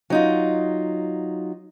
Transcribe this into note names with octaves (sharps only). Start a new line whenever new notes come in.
F#3 D#4 F4